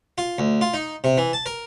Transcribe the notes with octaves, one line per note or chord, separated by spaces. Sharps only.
F4
D2
F4
D#4
C3
E3
A5
A#4